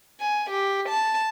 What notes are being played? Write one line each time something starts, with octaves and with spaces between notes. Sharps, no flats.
G#5
G4
A5